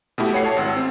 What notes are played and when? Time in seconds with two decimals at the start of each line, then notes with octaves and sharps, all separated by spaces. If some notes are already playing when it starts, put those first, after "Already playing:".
0.18 B2 A3 E4 G4
0.33 A3 C#5 F#5 C7
0.44 C#5 A5
0.57 G#1 F#5 E6
0.76 C4